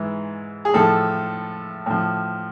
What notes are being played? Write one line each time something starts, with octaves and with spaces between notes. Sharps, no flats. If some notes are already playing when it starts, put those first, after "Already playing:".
Already playing: G#2 E3
G#4
A2 F3 A4
A2 F3